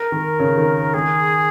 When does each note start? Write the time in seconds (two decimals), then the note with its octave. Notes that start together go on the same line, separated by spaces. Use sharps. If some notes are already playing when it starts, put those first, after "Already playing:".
Already playing: A#4
0.12 D#3
0.40 C#3
0.58 D#3
0.94 D#3 G#4